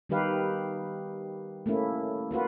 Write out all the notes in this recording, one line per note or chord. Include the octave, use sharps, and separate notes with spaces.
D#3 G3 D#4 G4 B4 F5
A3 A#3 C#4 E4
A#3 F4 F#4 B4